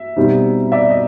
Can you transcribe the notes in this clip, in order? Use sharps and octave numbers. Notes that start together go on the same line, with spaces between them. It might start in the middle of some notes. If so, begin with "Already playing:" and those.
Already playing: E5
B2 G3 C4 D#4
D5 E5
D#5